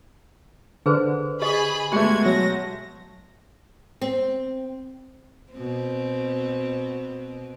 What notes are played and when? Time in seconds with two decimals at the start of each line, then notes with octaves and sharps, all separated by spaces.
0.86 D3 G#4 B4 C5
1.42 G4 G#4 D#5 B5
1.92 B2 G#3 A3 B3 G4 G5 C6 G#6
2.26 F#3 A#6
4.01 C4
5.53 B2 C4